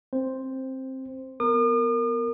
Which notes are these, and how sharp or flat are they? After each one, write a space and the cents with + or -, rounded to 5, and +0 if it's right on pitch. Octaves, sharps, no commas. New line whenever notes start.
C4 +15 C5 +0
B3 +0 A#4 -15 D#6 -45